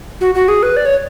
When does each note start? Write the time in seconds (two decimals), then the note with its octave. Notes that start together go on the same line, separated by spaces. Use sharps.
0.21 F#4
0.35 F#4
0.48 G#4
0.63 B4
0.77 D5
0.86 C#5